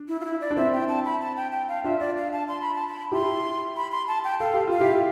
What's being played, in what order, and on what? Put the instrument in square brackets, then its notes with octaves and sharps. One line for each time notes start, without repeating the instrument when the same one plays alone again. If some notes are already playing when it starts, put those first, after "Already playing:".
Already playing: [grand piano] D4
[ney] E4
F4
E4
D5
[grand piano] D4
[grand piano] C4 E4 [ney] E5
[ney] G5
A5
B5
A5
G5
G5
F5
[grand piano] D4 F4 [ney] E5
[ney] D5
F5
A5
C6
B5
A5
B5
[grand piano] E4 G4 [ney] C6
[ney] B5
C6
A5
G5
[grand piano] A4 [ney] F5
[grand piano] G4
[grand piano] F4 [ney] F5
[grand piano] E4 G4